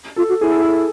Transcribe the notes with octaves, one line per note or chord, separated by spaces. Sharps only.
F4 A4
F#4
E4 G#4
A4
G#4